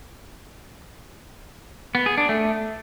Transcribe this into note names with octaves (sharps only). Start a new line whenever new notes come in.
B3
G#4
D4
A3